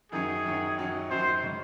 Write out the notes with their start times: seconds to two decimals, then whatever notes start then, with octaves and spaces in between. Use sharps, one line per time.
0.12 F#2 D#3 F#3 C#4 G#4
0.45 F#2 D#3 F#3 C#4
0.78 F#2 D#3 F#3 C#4
1.10 F#2 D#3 F#3 C#4 C5
1.42 C#3 G#3 C#4